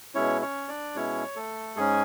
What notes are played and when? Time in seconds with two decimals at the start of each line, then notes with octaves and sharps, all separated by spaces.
0.15 B2 G#3 C#4 E4 C#5
0.42 C#4 C#5
0.68 D4 D5
0.95 B2 G#3 C#4 E4 C#5
1.36 A3 A4
1.76 G#2 G#3 C#4 G#4